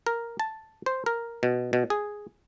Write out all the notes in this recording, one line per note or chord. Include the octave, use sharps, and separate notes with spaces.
A#4
A5
C5
A#4
B2
B2
G#4